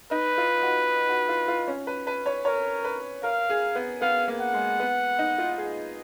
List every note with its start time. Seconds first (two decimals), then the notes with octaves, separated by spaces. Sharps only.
0.11 D#4 B4
0.38 F4
0.63 F#4
1.09 F#4
1.29 F4
1.48 F4
1.67 C#4
1.87 B4
2.07 B4
2.26 C#5
2.45 A#4 C#5
2.85 B4
3.23 A#4 F5
3.50 G#4
3.75 B3
4.01 B3 F5
4.28 A#3
4.40 F#5
4.54 G#3
4.80 B3
5.19 D#4
5.38 F4
5.58 G#4